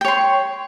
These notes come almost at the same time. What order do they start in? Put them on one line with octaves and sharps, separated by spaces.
G5 C#5 C6